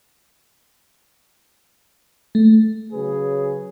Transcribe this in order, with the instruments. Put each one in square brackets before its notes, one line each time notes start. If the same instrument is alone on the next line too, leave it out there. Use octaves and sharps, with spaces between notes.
[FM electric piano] A3
[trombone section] C#3 F#3 G#4 B4